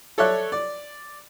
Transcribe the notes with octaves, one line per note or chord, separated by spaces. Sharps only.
A4 C#5 D5 E5 F#6
D5